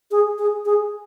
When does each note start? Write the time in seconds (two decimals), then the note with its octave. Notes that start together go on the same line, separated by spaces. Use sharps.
0.11 G#4
0.38 G#4
0.66 G#4